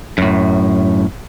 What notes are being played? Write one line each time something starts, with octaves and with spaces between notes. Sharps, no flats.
F#2 A2